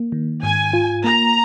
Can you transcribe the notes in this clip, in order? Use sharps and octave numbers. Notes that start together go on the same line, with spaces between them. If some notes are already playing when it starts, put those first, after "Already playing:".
Already playing: A#3
D#3
G#2 G#5
F4
A#3 A#5